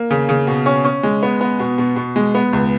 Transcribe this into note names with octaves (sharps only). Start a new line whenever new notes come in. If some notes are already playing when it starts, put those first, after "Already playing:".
Already playing: A#3
C#3
C#3
B2
C#4
C#4
G#3
B3
B3
B2
B2
B2
G#3
B3
C#2